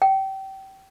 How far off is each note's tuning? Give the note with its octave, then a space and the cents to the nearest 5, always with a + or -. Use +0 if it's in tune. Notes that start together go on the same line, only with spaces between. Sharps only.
G5 -25